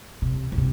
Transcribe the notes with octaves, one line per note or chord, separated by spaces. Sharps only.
C3
A#2
C3